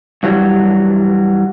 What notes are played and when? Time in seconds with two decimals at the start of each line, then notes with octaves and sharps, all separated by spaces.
0.23 G2 E3 F#3 G3